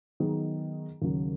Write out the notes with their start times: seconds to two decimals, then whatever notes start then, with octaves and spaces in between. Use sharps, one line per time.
0.20 D#3 F#3 B3 D#4 G#4
1.02 D#2 C#3 F#3